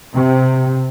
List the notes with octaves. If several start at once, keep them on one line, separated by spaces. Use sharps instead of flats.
C3